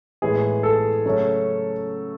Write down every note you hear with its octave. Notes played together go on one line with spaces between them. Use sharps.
A2 E3 G#3 B3 G#4
A4
C#3 F#3 A3 C#4